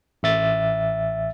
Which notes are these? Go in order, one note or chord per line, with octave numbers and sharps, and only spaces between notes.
A1 E5 A6